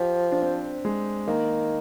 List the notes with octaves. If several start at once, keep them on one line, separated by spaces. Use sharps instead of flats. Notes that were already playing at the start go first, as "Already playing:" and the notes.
Already playing: F3 G4
D4
C4
G#3
D#3 A#3